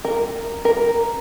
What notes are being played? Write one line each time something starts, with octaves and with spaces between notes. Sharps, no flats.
A#4
A#4